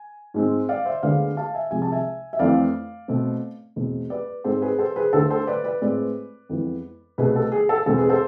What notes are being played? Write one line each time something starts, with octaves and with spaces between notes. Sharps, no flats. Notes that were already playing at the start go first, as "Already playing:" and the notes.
Already playing: G#5
G#2 G#3 C4
D5 F5
C5 E5
D2 D3 G#3 B3 D5 F5
F5 A5
E5 G#5
C2 C3 F3 G#3 G#5
A5
E5 G#5
E5
F2 E3 A3 C4 D5 F5
B2 A3 C4
E2 B2 A3 C4
B4 D5
G#2 G#3 C4 A4 C5
G#4 B4
A4 C5
G#4 B4
D2 D3 A3 A4 C5
A4 C5
B4 D5
B4 D5
A2 G#3 C4 B4 D5
F2 E3 G#3 B3
C2 B2 A3 C4 G#4 B4
A4
G#4
A4
E2 B2 G#3 C4 A4
G#4 B4
A4 C5